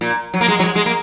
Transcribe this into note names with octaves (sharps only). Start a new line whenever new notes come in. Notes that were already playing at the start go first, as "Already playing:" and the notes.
A#2
F#3
A#3
G#3
F#3
G#3
G#3
A#3